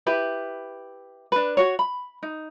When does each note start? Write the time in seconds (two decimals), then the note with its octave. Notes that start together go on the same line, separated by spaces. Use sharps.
0.07 E4 G4 B4
1.32 D4 B4
1.57 F#4 C#5
1.79 B5
2.23 D#4